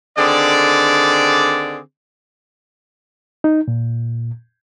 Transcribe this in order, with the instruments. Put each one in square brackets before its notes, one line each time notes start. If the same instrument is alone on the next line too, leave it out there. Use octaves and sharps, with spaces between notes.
[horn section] D3 D#3 C4 G#4 D5
[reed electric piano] D#4
A#2